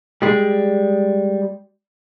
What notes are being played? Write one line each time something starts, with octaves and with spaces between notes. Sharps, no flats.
G3 G#3